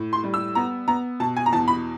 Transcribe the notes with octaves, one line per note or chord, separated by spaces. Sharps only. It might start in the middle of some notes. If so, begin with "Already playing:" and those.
Already playing: A2
C6
G3
E6
B3 A#5
B3 A#5
B2 A5
G#5
A#5
E2 A5
B5